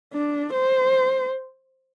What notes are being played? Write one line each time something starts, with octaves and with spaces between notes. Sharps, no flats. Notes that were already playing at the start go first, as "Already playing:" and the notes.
D4
C5